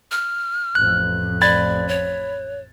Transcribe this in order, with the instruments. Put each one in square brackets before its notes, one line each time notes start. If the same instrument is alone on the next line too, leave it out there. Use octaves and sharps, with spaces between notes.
[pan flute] F6
[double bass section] A1 F2 [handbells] F#6
[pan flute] D5 [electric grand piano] B5 G#6 A6
[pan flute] C#5